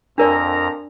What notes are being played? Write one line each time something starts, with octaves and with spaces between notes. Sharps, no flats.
F2 D4 A#4 D5 A#5